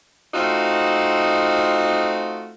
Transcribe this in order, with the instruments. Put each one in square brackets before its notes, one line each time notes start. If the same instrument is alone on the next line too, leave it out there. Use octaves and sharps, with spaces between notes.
[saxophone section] A3 C4 D#4 F4 F#4